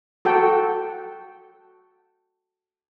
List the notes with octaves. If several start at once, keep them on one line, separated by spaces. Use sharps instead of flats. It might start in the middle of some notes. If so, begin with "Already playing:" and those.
F#4 A4 G5